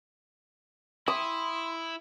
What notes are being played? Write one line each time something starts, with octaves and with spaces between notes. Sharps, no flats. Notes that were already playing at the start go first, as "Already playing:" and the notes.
E4 E5 C6 D#6